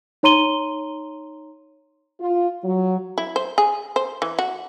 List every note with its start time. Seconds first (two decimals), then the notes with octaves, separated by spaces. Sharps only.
0.23 D#4 C#5 A#5 C6 D#7 G7
2.21 F4
2.64 F#3
3.18 E4
3.36 C5
3.58 G#4
3.96 C5
4.22 E3
4.39 F#4